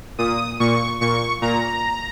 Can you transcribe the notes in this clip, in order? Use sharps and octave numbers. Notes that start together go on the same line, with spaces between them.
A#2 D#6
A#2 C#6
A#2 C#6
A#2 A#5